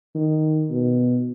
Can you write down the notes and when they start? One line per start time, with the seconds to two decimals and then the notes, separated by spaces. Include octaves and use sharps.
0.15 D#3
0.71 B2